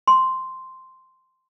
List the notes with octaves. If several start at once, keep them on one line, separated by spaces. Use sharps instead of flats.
C6